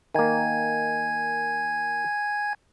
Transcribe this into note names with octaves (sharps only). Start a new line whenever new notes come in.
D#3 A#3 G#5 G#6